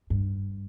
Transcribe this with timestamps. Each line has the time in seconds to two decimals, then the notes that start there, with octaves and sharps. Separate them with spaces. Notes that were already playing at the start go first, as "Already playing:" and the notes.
0.10 G2